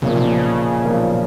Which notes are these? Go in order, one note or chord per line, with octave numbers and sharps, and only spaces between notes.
B1 A#2 C#3 F3 A#3
C3
C#3
B1 A#2 F3 A#3